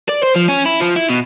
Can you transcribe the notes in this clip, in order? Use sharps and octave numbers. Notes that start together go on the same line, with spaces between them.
D5
C5
F3
C#4
E4
F3
E4
B2